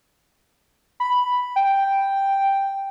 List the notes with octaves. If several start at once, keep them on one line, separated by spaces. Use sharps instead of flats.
B5
G5